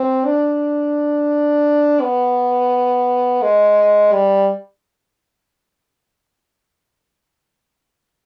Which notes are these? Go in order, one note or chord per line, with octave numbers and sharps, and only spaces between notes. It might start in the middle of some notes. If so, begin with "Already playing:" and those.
Already playing: C4
D4
B3
G#3
G3